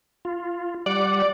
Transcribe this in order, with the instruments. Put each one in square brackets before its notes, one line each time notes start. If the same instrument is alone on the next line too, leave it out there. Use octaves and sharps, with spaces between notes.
[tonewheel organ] F4
[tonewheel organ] G3 F#5 [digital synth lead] D5